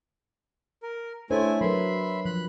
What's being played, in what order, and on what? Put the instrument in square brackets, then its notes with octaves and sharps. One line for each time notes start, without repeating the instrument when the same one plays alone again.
[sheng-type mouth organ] A#4
[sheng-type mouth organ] A3 E4 G#5 [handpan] D4 C5 C#5
[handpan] F#3 A#4 B4 [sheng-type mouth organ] E5 B5 C6
[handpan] F3 [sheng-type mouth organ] B5 F#6